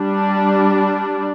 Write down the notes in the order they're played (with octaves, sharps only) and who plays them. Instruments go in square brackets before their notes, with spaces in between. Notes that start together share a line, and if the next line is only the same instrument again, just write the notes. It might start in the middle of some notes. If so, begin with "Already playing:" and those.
Already playing: [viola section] G3 D4